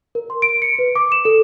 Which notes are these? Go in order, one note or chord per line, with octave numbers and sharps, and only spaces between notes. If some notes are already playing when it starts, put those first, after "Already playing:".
A#4
C6
D7
C#7
B4
D6
E7
A4